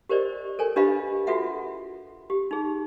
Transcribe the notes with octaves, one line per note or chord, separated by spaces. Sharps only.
G4 A#4 C5 D5 D#5
A4 A#4 C#5 G#5
D4 G4 B4 D#5 F5 B5
F4 F#4 A4 B4 E5 F#5
G4
D#4 G#4